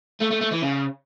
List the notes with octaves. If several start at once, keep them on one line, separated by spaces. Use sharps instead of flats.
A3
A3
A3
E3
C#3